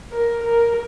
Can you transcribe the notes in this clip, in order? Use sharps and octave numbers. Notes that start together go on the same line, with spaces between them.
A#4
A#4